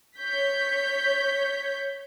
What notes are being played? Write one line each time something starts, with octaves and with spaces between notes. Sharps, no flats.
C#5 G6 B6